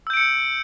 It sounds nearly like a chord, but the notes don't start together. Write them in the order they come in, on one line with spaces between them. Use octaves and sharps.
E6 G6 D7 C#7